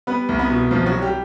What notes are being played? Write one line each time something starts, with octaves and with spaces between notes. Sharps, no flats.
G3 B3 B4
C2
B3 B4
B2
C2 F3 F4
F#3 F#4
G3
G3 G4